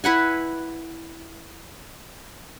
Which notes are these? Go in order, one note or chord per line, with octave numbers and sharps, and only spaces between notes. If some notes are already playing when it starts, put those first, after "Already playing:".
E4 B4 F#5 G#5